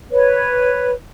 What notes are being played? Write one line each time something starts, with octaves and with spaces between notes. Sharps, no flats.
B4 C#5